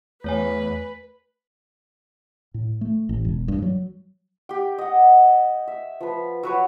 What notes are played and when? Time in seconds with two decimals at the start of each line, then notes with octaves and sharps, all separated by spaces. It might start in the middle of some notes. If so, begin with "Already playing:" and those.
0.24 E2 A3 B4 C#5 G#5
2.54 A2
2.81 A3
3.09 A1
3.25 E1
3.48 G2
3.62 F#3
4.49 G4 G5
4.78 D#5 F#5
5.68 E5
6.01 F3 B4
6.43 F#3 B4 C#5